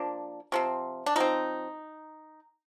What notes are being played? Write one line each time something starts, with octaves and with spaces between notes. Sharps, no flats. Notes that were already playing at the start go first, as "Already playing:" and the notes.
Already playing: F3 A#3 D4
C3 F3 C4
D4
F3 C4 D#4